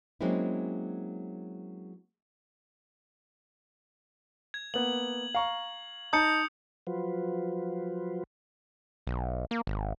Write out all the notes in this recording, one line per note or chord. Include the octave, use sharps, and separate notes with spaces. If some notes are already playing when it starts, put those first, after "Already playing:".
F#3 G#3 A#3 C4 C#4 E4
G#6
A#3 B3 F#7
F5 A#5 C#6
D#4 A5 A#5 D#6 G6 C#7
F3 F#3 F4 F#4 B4 C5
B1
A#3
G#1